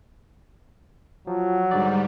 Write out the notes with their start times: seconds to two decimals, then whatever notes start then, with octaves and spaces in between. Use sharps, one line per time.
1.27 F3 F#3
1.71 G#2 D3 G3 D5